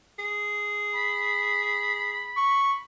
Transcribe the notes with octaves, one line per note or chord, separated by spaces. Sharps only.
G#4
B5
C#6